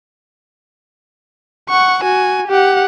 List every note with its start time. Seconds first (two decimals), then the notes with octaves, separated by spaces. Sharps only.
1.69 F#5 C#6
2.03 F#4 G#5
2.47 G4 F#5